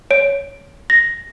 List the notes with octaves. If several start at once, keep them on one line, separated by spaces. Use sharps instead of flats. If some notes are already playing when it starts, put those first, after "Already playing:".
C#5 D7
A#6